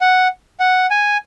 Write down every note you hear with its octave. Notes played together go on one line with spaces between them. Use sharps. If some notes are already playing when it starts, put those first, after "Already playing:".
F#5
F#5
G#5